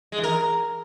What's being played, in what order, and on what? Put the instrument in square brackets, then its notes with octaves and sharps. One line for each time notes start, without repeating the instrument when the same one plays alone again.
[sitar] G#3
E3
A#4